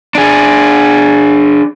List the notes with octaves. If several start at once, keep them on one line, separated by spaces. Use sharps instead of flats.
D4 G#4